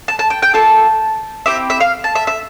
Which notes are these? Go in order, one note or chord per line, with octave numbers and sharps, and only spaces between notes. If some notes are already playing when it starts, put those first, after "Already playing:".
A5
A5
G5
G5
A#3 F4 A4 A5
C4 E4 G4 E5
E5
F5
A5
E5
E5